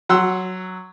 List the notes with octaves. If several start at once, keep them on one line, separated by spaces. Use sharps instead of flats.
F#3 F#5 C6 E6